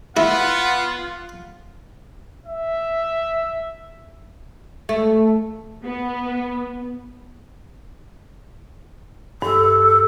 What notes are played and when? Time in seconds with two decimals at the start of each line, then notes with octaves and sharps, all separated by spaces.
0.17 B3 E4 F4 F#5
2.46 E5
4.89 A3
5.84 B3
9.42 G2 A4